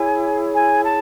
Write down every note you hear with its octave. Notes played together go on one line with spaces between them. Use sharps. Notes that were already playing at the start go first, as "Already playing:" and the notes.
Already playing: E4 G#4 C#5 G#5
G#5
A5